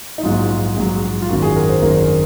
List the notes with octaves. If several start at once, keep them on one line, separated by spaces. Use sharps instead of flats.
D#4
A#1 G#2 F#3 F4
A#1 G#2 F#3
F4
G#1 F#2 D#3 F#4
G#4
A#4
C5
G#1 F#2 D#3 A#4
A#4